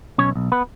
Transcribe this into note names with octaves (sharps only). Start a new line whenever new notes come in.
B1 C#4 C#5
B1
B3 B4